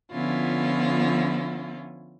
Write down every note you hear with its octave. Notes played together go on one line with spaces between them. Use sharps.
D3 F3 B3 C#4 E4 F4